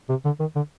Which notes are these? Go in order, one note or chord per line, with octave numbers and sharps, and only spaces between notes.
C3
D3
D#3
D3